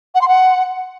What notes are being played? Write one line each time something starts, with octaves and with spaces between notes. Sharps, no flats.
F#5
C6
F#5